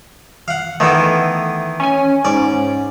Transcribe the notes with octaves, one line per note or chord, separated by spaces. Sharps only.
F5 F#5
D#3 E3 A3 B3
C#4 G#5
G#2 C#4 D5